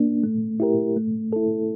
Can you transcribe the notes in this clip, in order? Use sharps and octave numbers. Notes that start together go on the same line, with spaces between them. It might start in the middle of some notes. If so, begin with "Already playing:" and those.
Already playing: A#3 D4
A3
E4 G4 A#4
A3
E4 A4